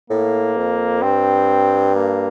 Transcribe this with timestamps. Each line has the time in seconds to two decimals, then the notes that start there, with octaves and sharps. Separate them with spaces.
0.10 A2 A#3
0.57 F2
1.02 G2 C4
1.94 A#3